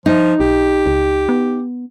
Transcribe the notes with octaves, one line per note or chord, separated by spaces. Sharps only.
F3 D#4
B1 G4
C#2
B3